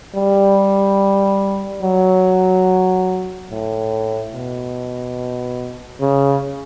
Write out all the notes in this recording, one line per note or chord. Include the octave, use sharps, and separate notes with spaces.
G3
F#3
A2
B2
C#3